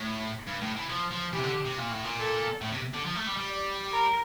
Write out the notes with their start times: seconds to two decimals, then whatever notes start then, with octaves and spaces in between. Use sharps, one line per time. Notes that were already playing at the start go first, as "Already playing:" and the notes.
Already playing: A2
0.47 G2
0.61 A2
0.76 E3
0.89 F3
1.11 F3
1.33 E3 G4
1.39 C3
1.44 D3
1.65 C3
1.78 A#2
1.91 A2
2.04 A#2
2.19 A4
2.61 A2
2.72 C3
2.94 D3
3.05 F3
3.15 A3
3.26 G3
3.37 G3
3.48 D5
3.91 A#4